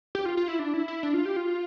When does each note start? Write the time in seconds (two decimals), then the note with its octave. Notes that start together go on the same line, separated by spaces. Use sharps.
0.15 G4
0.25 F4
0.37 F4
0.48 E4
0.59 D4
0.74 E4
0.88 E4
1.03 D4
1.14 F4
1.25 G4
1.36 F4